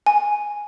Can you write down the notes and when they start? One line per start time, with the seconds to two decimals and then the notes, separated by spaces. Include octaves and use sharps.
0.06 G#5